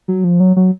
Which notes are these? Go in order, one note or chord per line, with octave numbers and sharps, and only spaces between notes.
F#3
F3
F#3
F#3